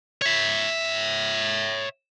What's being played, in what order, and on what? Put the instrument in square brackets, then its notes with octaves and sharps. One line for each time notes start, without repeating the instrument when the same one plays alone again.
[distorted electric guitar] C#5 E5